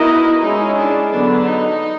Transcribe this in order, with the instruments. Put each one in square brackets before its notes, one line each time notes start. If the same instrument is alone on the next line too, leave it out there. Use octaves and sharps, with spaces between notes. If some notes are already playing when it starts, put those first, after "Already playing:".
Already playing: [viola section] B3 D#4 F#4 A#4 D#5 [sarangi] E4
[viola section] G#3 C#4 E4 G#4 [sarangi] D#4
[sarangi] D4
[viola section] D3 F#3 B3 [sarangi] D4
[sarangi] D#4